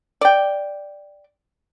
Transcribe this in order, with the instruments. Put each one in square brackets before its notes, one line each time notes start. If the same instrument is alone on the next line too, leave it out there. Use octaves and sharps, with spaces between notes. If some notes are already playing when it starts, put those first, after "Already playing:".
[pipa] D5 G5